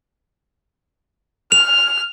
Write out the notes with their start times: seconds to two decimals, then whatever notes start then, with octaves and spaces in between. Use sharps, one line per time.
1.52 F6 F7